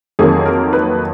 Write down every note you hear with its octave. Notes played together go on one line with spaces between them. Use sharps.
F2 D#3 F#3 A#3 G#4
A#4
B4